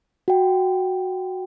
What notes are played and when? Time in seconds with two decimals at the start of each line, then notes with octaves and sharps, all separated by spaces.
0.28 F#4 G5